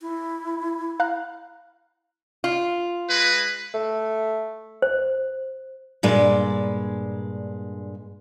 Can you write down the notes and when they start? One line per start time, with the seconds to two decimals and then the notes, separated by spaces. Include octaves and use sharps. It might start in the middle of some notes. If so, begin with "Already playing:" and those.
0.01 E4
1.00 F5 A#5 F#6
2.44 F4
3.10 G#3 B4
3.74 A3
4.82 C5
6.03 G2 A#2 G#3 D5